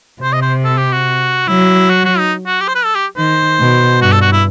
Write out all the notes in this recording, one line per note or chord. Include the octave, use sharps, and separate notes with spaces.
C3 C5
D#5
C5
A4
G4
F#4
F#3 E4
F#4
F#4
D#4
F#4
G4
C5
B4
A4
G4
D#3 C5
B2
G2 F#4
A4
F#4
E4